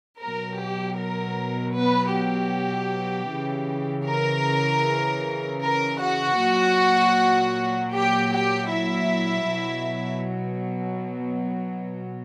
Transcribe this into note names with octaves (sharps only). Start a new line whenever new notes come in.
B2 F#3 A#4
G4
A#4
B3 B4
G4
C#3 E3
A#4
A#4
F#4 F#5
A#2 F#3
G4 G5
G4 G5
E4 E5
B2 F#3